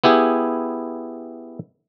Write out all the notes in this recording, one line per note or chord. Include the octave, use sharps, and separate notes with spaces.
B3 E4 G4 G#4